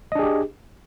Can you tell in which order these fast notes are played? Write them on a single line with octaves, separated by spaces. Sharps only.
D#5 D4 G#4 G4